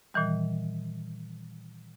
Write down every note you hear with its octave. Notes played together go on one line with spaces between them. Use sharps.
A#2 D#3 E3 G3